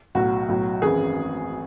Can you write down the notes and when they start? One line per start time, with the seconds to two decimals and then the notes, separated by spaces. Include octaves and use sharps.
0.15 B1 A2 F#3 F#4
0.48 B1 A2 F#3
0.82 G#1 F#2 E3 G#4